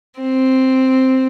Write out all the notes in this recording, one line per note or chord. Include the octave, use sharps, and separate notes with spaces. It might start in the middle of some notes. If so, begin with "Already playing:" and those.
C4